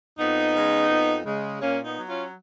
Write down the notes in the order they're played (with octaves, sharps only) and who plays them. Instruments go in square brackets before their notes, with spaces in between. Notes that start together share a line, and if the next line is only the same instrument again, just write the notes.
[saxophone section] F2 B3 D#4
C#3 G#3
F2
C#3 G#3
A#2 A#3 C#4
B3 D#4
F#3
C#4 F4